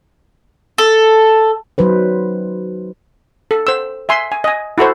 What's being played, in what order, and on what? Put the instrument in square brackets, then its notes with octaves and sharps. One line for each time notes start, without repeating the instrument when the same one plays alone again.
[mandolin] A4
[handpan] F#3 D#4 B4 C5
[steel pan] A4
C5 E6
E5 G#5 C6
G#5
D#5 G#5
E4 F#4 A4 C5